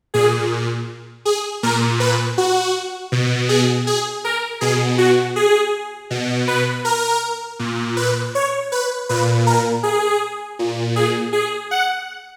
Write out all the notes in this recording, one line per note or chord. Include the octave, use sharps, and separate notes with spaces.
A#2 G#4
G#4
A#2 A#4
B4
F#4
B2
G#4
G#4
A#4
B2 G#4
F#4
G#4
B2
B4
A#4
A#2
B4
C#5
B4
A#2 B4
A#4
G#4
A#2
G#4
G#4
F#5